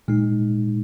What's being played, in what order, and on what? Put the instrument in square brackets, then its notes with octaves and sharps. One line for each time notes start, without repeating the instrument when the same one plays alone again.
[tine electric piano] A#2 G#3 D#4